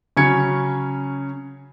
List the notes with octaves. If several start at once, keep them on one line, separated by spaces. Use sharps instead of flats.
C#3 F#3 C#4 G#6 C#7